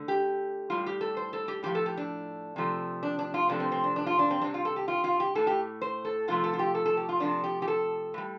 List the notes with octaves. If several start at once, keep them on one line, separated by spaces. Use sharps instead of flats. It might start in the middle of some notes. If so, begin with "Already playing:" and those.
Already playing: D3 A3
G4
A2 G3 F4
G4
A4
C5
A4
G4
A2 F3 A3 G4
A4
G4
D4
C3 F3 A3
D4
D4
F4
C3 F3 A3 D4
C4
C4
D4
D4
F4
D4
C4
C3 G3 D4
F4
A4
G4
F4
F4
G4
A2 A3 A4
G4
C5
A4
C3 F3 A3 F4
A4
F4
G4
A4
A4
G4
F4
C3 F3 A3 D4
G4
G4
A4
A2 G3